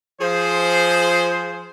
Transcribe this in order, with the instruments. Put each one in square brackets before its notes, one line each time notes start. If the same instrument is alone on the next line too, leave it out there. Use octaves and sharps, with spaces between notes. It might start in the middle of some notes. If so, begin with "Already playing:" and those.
[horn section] F3 G#4 C5